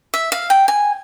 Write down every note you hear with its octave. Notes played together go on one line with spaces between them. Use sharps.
E5
F5
G5
G#5